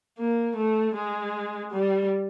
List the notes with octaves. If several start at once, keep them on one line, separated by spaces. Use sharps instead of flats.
A#3
A3
G#3
G3